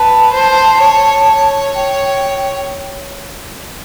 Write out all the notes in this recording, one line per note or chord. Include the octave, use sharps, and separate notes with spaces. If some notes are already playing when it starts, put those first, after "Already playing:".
Already playing: B4 A5
C5
C#5
C#5
G5